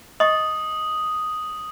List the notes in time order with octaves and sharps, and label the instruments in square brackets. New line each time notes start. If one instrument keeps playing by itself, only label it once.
[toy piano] D#5 C#6 [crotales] D#6